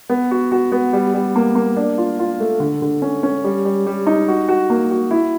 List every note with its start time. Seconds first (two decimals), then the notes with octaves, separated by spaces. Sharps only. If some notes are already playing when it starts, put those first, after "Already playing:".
0.10 B3
0.31 F#4
0.52 F#4
0.72 B3
0.93 G3
1.14 G3
1.36 A#3
1.55 A#3
1.77 D4
1.98 F4
2.19 F4
2.40 A3
2.60 D3
2.82 D3
3.02 C#4
3.23 C#4
3.44 G3
3.65 G3
3.86 G3
4.07 D#4
4.28 F#4
4.48 F#4
4.70 A#3
4.91 F#4
5.11 E4